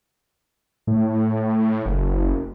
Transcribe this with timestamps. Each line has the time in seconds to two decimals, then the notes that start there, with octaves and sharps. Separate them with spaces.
0.87 A2
1.86 F#1